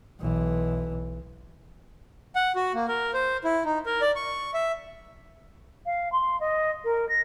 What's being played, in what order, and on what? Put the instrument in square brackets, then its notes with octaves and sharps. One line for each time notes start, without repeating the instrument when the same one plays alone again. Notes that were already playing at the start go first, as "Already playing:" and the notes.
[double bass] B1 E3
[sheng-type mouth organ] F#5
F#4
A#3
A#4
C5
E4
D#4
A#4
D5
C#6
E5
[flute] F5
C6
D#5
A#4
A#6